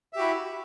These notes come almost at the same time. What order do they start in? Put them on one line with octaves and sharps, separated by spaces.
E5 G4 F#4 E4